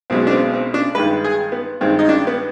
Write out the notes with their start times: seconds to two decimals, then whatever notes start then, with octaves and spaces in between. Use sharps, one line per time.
0.10 B1 B2 G#3 C4
0.27 D4
0.31 C4
0.53 C4
0.74 D4
0.95 G2 D#3 G#3 B4
1.24 G#4
1.52 B3
1.81 G2 D#3 G#3 C4
1.99 D#4
2.09 D4
2.27 B3